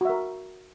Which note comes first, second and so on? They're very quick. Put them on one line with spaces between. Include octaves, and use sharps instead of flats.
F#4 E5 A#4